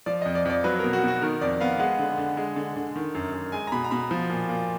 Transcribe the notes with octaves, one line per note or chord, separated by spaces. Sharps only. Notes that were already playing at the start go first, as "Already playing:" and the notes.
F3 D5
F2 D#5
D5
F2 D5
F#3 B4
B2 A#4
F#4
B2 F#4
D#3 A#4
F2 D5
B3 F5
G#3 F#5
D3
D3
G#3
D3
D3
D#3
F#2
F#2
G#3 G#5
A#5
B2 B5
A#5
B2 B5
F3
A#2
A#2